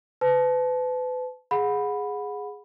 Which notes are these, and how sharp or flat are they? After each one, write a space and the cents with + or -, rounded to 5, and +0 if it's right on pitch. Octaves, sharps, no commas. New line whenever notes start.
B4 +35 A5 -25
G#4 +0 F#5 -25 B5 +0